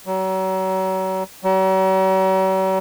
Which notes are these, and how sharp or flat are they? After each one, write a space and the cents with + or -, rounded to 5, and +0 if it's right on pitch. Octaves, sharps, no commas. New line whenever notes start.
F#3 +35
F#3 +45